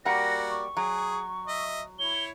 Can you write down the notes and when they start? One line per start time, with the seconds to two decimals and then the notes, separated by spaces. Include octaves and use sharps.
0.05 G3 A#3 F#4 A#4 D5 F#5 A#6
0.50 C#6
0.77 F#3 G#4
1.48 D#5 E5
1.99 E4 C#5 G7